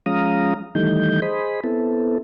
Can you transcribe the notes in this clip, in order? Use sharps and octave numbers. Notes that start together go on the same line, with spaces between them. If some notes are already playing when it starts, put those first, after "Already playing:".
F3 G#3 C#4 F5 A#5 D#6
D#3 E3 G3 A3 D#4 G6
G#4 C5 D#5 B5
B3 C4 E4 A4